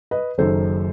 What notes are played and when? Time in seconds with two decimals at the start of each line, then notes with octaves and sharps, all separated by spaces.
0.11 B4 D#5
0.38 F#1 F#2 D#3 A4 C5